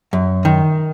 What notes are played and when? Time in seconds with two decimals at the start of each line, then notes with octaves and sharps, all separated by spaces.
0.13 F#2
0.45 D#3